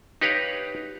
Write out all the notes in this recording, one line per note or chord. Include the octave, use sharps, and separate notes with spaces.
D#4 G4 B4 C#5 F5